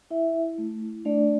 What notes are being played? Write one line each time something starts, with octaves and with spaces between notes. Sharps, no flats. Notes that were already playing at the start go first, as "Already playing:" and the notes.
E4 E5
E4
A3
E4
A3 D4 D5